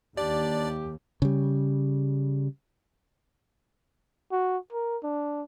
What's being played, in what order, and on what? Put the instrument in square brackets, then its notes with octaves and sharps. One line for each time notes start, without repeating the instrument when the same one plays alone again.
[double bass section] D#2 [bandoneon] D4 [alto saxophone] G4 [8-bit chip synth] D5
[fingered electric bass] C#3 G3
[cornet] F#4
A#4
D4